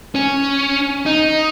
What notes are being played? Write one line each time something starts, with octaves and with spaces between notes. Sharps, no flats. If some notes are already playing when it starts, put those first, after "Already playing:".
C#4
D#4